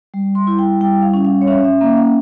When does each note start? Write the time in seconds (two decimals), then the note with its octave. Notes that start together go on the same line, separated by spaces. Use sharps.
0.14 G3
0.35 C6
0.47 E4
0.59 G5
0.81 G3 G5
1.02 F5
1.14 C#4
1.25 F5
1.41 C#5
1.47 C#4 E5
1.64 E5
1.81 A#3 E5
1.97 F5